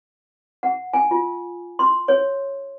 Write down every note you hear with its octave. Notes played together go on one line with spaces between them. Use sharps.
F#5
G#5
F4
C6
C#5